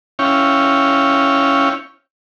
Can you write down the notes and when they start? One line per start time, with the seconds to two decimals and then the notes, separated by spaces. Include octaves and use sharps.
0.19 C#4 E4 C#5 F5 G5